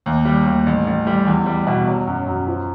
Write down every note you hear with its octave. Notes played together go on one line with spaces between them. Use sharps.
D#2
G3
D#2
A1
A1
G3
E2
G3
B2
F#3
F#2
F#2
F3